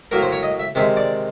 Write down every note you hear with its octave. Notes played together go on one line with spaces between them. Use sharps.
A2 F#3 A#3 A#4
C5
C#5
D#5
E5
C3 D#3 G#3 E5
D5